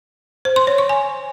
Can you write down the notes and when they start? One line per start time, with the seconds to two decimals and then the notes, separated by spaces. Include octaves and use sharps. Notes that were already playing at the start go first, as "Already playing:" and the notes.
0.45 C5
0.56 C6
0.67 C#5
0.78 C#6
0.89 G#5